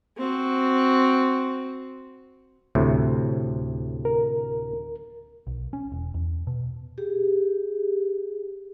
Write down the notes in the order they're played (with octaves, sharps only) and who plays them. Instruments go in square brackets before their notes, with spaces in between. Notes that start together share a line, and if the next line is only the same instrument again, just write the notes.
[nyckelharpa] C4 F#4
[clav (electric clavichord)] D2 A2 C3
[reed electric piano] A#4
[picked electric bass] B1
C#4
E1
E2
B2
[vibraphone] G4 G#4